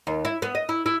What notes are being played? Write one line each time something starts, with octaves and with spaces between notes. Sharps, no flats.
D#2
E4
B3
D#5
E4
E4